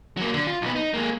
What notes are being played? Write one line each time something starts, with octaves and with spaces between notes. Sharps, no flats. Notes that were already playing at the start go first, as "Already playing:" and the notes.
F#3 A#3
D3
F4
B1 B3
D#4
G#3 A#3